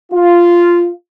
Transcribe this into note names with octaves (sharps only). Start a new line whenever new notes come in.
F4